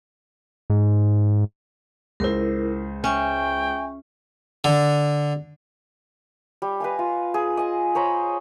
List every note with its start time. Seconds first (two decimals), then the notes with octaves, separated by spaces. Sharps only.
0.70 G#2
2.20 C#2 E4 A#4 C5
3.04 C#4 E5 G5 G#5 C#6
4.64 D3
6.62 G3
6.80 B4 D#5 F5 G#5
6.99 F4
7.34 G#4
7.57 D#5 G#5
7.95 C5 C#5 A#5 B5